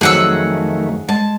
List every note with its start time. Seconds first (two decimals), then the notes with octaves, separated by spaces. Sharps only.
0.01 F2 D#3 F#3 A3 G#4 F#5 A5 E6
1.09 G#3 A5